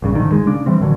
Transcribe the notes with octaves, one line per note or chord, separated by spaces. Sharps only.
A#1 G2 C#3
F#1 G#2 D3 D#3
G#3
C#3 D4
E3 G3 C4
A#2 D3 F#3